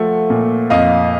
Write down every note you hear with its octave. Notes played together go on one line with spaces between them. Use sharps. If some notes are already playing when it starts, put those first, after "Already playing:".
Already playing: F3 A3 F#5
A#2
F2 D#5 F5